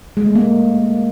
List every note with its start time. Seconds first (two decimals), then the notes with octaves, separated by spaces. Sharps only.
0.17 G#3
0.26 A3
0.35 A#3